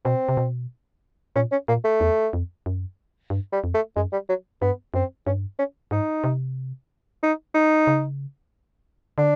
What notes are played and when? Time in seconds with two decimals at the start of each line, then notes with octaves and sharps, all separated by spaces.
0.05 B2 C4
0.29 C3
0.37 B2
1.36 A#2 C#4
1.52 C#4
1.68 A#2 A#3
1.84 A3
2.01 E2
2.33 F2
2.66 F#2
3.30 G2
3.52 G3
3.64 F2
3.74 A3
3.96 F#2 G#3
4.12 G3
4.29 F#3
4.61 G2 B3
4.94 F#2 C4
5.26 G2 C#4
5.59 C#4
5.91 G#2 D#4
6.24 C3
7.23 D#4
7.54 D#4
7.87 C#3
9.18 D3 D4